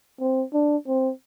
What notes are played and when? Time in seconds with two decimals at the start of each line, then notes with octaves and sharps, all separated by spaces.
0.21 C4
0.54 D4
0.88 C4